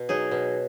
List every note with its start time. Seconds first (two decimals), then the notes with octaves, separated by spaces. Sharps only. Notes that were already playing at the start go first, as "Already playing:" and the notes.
Already playing: B2
0.09 F#3 D#4 G#4
0.31 B2